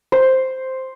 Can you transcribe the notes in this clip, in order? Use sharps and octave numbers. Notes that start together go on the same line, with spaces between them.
C5